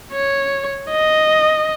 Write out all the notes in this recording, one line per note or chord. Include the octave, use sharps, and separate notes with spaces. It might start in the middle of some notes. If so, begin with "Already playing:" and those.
C#5
D#5